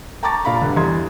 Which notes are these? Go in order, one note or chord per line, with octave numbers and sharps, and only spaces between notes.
G5 A5 A#5 C#6 D6 A6
A#2 F5 A#5 B5
D2 G2 D3
E2 E3 G3 C6 G#6